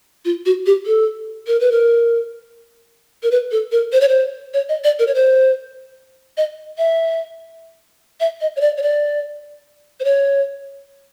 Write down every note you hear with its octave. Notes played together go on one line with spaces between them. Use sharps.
F4
F#4
G4
A4
A#4
B4
A#4
A#4
B4
A4
A#4
C5
C#5
C5
C#5
D#5
D5
A#4
C#5
C5
D#5
E5
E5
D#5
C#5
D5
C#5
D5
C5
C#5